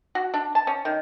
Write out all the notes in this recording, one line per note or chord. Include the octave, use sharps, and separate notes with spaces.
F#4
D4
A5
C#4
D#3